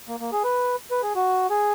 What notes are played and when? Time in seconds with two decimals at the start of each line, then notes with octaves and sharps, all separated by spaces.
0.08 A#3
0.20 A#3
0.32 G#4
0.44 B4
0.91 B4
1.03 G#4
1.15 F#4
1.50 G#4